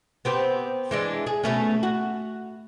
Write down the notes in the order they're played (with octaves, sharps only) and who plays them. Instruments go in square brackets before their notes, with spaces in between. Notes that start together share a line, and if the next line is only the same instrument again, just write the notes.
[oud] B3 C4 G4
E3 G#3 D4
G#4
B2 A3 C#4
F#4